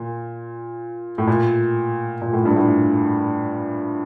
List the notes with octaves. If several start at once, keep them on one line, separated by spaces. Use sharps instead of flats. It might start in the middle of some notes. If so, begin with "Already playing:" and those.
Already playing: A#2
A2
A#2
A#2
A2
G2
A2